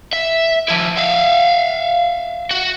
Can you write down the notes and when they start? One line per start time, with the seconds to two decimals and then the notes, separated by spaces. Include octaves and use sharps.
0.13 E5
0.68 F3 E4
0.98 E5 F5
2.51 F#4